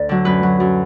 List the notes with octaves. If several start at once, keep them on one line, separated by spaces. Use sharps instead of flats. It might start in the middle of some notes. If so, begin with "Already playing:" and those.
Already playing: D2 D5
D3 F#3
F#2 B4
F#3
F#2